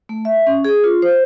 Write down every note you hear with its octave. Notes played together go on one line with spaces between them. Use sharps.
A3
E5
C#4
G#4
F4
C5